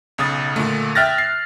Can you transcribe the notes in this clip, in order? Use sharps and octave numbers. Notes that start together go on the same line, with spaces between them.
B1 C#3 D#6 A6
A#2 D3 A3
E5 G5 F6 F#6 A6 A#6
C7